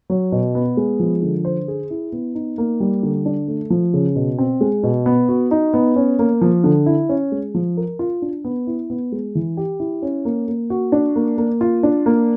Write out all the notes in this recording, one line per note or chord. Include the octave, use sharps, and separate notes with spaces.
F#3
B2
B3
G#3
F3
D3
C5
G#4
E4
B3
D#4
A#3
G3
D3
D4
A3
F3
C#3
B2
C4
G#3
B2
B3
F#4
D#4
B3
C#4
A#3
F3
D3
E4
C#4
G#3
F3
A#4
F4
D4
B3
E4
B3
G#3
E3
G4
E4
C#4
A#3
A#3
F#4
D4
A#3
A#3
F4
D4
A#3